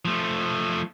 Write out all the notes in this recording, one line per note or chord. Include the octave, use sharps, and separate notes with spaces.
F3 A3